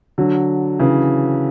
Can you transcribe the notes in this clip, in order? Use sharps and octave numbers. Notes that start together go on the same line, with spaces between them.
D3 F#3
C#3 E3